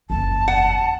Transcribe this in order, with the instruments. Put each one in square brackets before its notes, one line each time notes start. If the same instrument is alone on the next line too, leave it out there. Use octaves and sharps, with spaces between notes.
[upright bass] F#1 E2 [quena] A5
[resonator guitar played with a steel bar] F#5